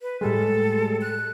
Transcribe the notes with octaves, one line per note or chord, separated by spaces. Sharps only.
B4
A2 G3 G#3 A4
F#6